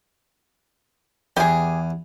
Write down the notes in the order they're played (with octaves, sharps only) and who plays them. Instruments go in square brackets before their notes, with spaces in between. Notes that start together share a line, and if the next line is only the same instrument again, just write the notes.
[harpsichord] E2 G#5 [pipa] G4 G#4